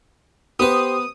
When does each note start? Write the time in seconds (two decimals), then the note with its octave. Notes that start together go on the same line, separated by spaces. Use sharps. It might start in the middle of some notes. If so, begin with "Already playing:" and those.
0.59 B3 G4 B4 C5 D#6